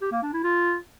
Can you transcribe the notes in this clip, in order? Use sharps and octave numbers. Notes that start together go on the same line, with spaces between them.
G4
A#3
D4
E4
F4